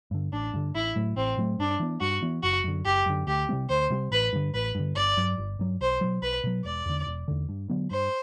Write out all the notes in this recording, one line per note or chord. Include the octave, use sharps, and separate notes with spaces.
G2 D3
A1 D4
G2 D3
A1 E4
A2 F#3 A3
A1 C4
A2 F#3 A3
G2 D4
E3 B3
G2 F#4
E3 B3
F#1 F#4
F#2 D3
F#1 G4
F#2 D3
D2 G4
C3 G3 C4
D2 C5
C3 G3 C4
A1 B4
G2 D3
A1 B4
G2 D3
G1 D5
G2 F#3
G1
G2 F#3
B1 C5
B2 F#3
B1 B4
B2 F#3
E1 D5
E2 D3
E1
E2 D3
G2
D3 F#3 B3
G2 C5